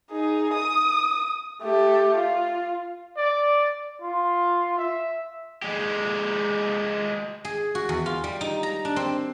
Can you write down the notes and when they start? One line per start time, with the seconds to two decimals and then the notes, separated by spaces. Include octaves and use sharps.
0.11 D#4 G#4
0.54 D#6
1.62 A3 G4
2.17 F4
3.17 D5
4.02 F4
4.79 E5
5.62 G#3 G4
7.45 G#4
7.75 F#4
7.89 E2
8.06 F4
8.24 G3
8.41 D#4
8.63 A#5
8.85 D4
8.96 C4